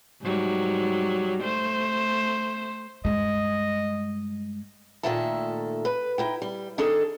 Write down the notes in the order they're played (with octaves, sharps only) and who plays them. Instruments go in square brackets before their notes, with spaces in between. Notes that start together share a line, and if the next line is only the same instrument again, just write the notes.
[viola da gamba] G#2 F#3 G3
A3 C5
[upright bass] G2 G#3 [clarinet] D#5
[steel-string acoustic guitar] A#2 D#3 A3 A4 E5 A5
B4
D#4 E4 G5
G3
D#3 D4 D#4 G#4 A4